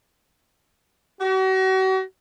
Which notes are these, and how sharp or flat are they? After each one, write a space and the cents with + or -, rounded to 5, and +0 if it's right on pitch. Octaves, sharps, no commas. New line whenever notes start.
F#4 +40